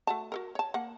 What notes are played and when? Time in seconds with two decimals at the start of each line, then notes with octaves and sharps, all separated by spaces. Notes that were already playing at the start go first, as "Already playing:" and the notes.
0.07 A3 F#4 A5
0.32 F#4 A4 A#4
0.55 C#5 A5
0.74 A#3 F#5